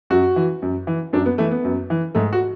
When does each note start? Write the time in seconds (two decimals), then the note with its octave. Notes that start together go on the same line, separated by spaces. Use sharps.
0.10 F#2 F#4
0.36 E3
0.62 F#2
0.87 E3
1.13 F#2 D4
1.26 B3
1.38 E3 A3
1.51 B3
1.64 F#2
1.90 E3
2.15 G#2 A3
2.33 F#4